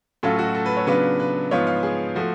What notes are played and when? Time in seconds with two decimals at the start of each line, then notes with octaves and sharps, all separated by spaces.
0.23 A2 F#3 C#4 F4 A4
0.39 F#4
0.55 A4
0.66 B4
0.77 C#5
0.87 C#3 F#3 B3 D4 F4 B4
1.20 B4
1.51 G#2 F3 B3 F4 C#5
1.67 F5
1.83 G#4
2.15 F3 A3 F#4